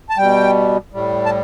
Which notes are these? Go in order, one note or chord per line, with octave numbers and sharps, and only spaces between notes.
A5
B2 G3 G5
A2 G3
A5